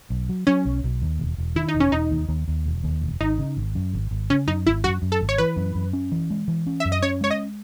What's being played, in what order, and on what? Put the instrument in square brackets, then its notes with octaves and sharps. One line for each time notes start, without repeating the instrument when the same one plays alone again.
[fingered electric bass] B1
F#3
[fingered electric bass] F#3 [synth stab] C#4
[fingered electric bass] B1
B1
D#2
E1
E1
[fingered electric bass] D#3 [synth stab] E4
[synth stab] D#4
[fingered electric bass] E1
[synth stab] C#4
[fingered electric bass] E1 [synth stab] D#4
[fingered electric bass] D#2
D#2
D#2
E1
D#2
E1
[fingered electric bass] G#1 [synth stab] D#4
[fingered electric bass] C#3
G#1
F#2
G#1
G#1
[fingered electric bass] C#3 [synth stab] C#4
[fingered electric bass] F#2 [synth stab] D#4
[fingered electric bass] G#1 [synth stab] E4
[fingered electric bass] F#2 [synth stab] F#4
[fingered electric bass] F#2
[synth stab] A4
[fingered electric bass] G#1
[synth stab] C#5
[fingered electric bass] E3 [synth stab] B4
[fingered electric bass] F#2
F#2
C#4
E3
G#3
E3
C#4
[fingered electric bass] F#2 [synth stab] E5
[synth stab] D#5
[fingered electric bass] C#4 [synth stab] C#5
[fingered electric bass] G#3 [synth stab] C#5
[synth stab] D#5